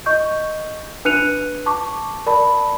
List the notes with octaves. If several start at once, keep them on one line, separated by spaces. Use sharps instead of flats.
D#5 C#6 G6
D4 B4 F#6 C#7 D#7 F7
A5 C#6 D6
A#4 D5 A5 B5